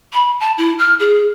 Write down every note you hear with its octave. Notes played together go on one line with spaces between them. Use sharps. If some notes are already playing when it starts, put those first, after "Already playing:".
B5
A5
E4
F6
G#4